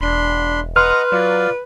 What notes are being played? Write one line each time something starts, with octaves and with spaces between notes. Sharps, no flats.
E1 D4 B5 C6
B4 D#5 F#5 A#5 C6 F6
F#3 F4 D5